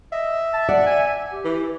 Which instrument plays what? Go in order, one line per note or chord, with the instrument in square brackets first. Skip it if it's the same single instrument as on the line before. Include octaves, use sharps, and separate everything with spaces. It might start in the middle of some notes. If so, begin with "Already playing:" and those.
[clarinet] D#5 [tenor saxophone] E5
[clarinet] A5
[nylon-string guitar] D5 [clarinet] F#5
[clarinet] G#5
G4
[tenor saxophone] E3